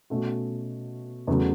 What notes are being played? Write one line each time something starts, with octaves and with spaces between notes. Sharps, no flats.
B2 A3 C#4 F#4
E2 C#3 F#3 A3